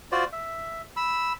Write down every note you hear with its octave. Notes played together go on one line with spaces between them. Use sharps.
F4 F#4 C5 D5
E5
B5 E6